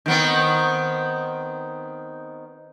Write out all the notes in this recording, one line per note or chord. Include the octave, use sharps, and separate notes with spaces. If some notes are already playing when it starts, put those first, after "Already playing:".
D#3 B3 C4